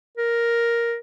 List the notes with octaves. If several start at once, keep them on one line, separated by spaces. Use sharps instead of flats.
A#4